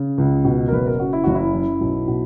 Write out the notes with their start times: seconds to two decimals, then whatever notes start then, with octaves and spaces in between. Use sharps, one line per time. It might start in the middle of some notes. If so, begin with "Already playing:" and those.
Already playing: C#3
0.18 C#2
0.45 B2
0.68 A#4
0.72 F#1 B4
0.86 A#4
0.99 F#2 F#4
1.13 E4
1.24 F#1 F#4
1.35 E4
1.54 F#2
1.81 B1
2.08 B2